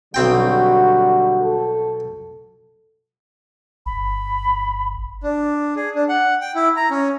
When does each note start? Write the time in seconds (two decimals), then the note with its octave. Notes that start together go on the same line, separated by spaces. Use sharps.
0.14 B1 D3 G3 C4 F#4 G5
1.42 A4
3.86 G1 B5
5.22 D4
5.76 G#4
5.95 D4
6.09 F#5
6.41 G5
6.55 E4
6.77 A#5
6.91 C#4